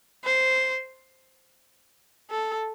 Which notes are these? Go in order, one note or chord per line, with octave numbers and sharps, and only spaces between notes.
C5
A4